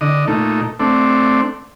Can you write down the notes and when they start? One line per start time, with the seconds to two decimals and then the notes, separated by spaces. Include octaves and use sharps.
0.01 D3 D#5
0.28 A#2 A3 D#4
0.79 A3 C4 D4